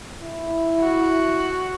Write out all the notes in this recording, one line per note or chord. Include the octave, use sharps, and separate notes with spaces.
E4
F#4